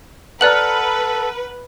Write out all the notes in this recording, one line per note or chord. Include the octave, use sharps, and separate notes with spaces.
A4 B4 D5 F#5 A#5 F6 F#6 F#7